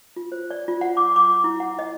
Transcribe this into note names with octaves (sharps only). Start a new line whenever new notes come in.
F4
C5
D5
F4
F#5
D6
D6
E4
F#5
D#5